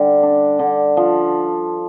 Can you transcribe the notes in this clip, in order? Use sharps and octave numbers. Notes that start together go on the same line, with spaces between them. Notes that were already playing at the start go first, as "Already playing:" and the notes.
Already playing: D3 G3
D4
D3
F3